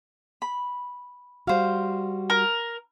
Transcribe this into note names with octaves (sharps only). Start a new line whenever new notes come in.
B5
G3 F#4 C5 F5
A#4